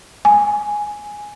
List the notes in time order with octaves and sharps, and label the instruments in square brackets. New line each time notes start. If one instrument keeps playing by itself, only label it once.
[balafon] G#5